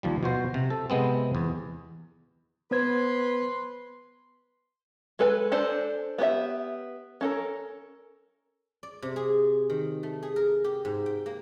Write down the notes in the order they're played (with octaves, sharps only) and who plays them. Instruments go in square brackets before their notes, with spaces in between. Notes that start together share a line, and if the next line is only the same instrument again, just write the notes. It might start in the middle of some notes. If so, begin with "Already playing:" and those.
[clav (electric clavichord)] D#2 F3 G3
B2 F#4 C5
C3
A4
C3 G#3 B3 C4
E2
[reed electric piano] B3 C5 G#6 [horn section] B4 C6
[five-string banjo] G#3 A4 B4 G#5
D4 A4 C5
B3 G4 C#5 E5
C#4 A4 A#4
[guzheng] D5
C3
G#4
D#3
A3
G#4
A#4
G4
G#2
G5
A#3